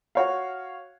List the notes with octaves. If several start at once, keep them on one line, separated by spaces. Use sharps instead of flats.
F#4 C#5 F5